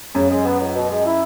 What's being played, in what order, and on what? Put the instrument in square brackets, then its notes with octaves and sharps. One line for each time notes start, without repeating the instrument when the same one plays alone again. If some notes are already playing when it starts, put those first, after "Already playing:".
[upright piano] F#2 [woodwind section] C#3
[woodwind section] G#3
B3
C#2
B2
G#3
E4